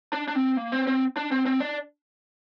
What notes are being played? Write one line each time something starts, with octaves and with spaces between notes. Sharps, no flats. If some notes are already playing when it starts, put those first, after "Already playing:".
D4
D4
C4
A#3
C4
C4
D4
C4
C4
D4